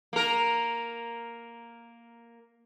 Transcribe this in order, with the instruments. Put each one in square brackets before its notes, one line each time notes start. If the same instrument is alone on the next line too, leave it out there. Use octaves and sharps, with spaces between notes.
[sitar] A#3 A#4